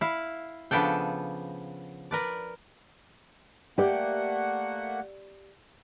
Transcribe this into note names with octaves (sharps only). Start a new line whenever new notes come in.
E4 F5
C#3 F3 B3 D4 A4 G5
A#4 B4 D5
A3 A#3 G4 D5 F#5